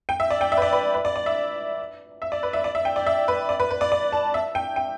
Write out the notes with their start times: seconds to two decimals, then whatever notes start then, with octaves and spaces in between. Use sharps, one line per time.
0.09 G5
0.20 E5
0.31 D5
0.41 G5
0.52 E5
0.57 B4
0.62 D5
0.73 B4
0.94 B4
1.05 D5
1.16 D5
1.26 E5
2.22 E5
2.32 D5
2.43 B4
2.53 E5
2.64 D5
2.75 E5
2.85 G5
2.96 D5
3.07 E5
3.28 B4
3.49 D5
3.60 B4
3.71 B4
3.81 D5
3.92 D5
4.13 A5
4.34 E5
4.55 G5
4.76 G5